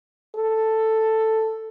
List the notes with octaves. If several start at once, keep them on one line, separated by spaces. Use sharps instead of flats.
A4